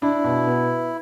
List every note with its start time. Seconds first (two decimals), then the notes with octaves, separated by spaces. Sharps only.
0.02 D4 E4
0.24 B2
0.47 B3